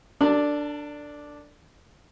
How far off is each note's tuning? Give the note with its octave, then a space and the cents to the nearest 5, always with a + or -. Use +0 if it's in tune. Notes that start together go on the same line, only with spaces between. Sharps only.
D4 +0 A4 +45 D5 +0